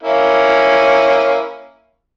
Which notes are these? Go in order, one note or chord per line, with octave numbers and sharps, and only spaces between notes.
A#3 C#4 E4